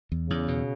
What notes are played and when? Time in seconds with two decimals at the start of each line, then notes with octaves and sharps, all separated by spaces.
0.12 E2
0.29 E2 C#3
0.48 B2